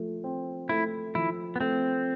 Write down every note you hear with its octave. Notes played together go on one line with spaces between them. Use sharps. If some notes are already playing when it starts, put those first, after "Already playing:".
Already playing: F3 A3
C4
A3 E4
F3 E4
B3
A3 C4